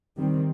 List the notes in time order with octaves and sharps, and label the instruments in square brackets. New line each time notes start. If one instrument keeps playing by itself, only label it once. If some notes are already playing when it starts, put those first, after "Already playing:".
[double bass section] D#3 G3 C4